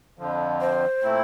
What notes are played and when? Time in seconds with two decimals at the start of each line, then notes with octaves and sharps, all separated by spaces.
0.18 F2 D3 F3
0.61 C5
1.03 A#2 A3 C4 E4